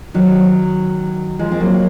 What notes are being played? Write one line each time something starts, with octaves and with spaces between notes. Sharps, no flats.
D#3 F#3
F3 G#3
C4
F#3 A#3